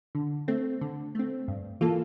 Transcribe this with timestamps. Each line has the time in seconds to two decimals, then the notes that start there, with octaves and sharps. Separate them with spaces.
0.15 D3
0.48 A3 C4
0.81 D3
1.15 A3 C4
1.48 G2
1.81 E3 A#3 F4 A4